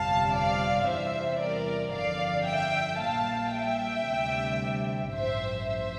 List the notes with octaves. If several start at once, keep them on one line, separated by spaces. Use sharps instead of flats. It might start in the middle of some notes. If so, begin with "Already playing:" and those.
Already playing: G1 F2 C3 G3 F5 A5
D5 F5
E2 C3 E3 G3 C5 E5
A#4 D5
G1 F2 D3 D5 F5
E5 G5
A#1 A#2 G3 F5 A5
E5 G5
D2 C3 G3
A1 G2 F3 C5 E5
C5 E5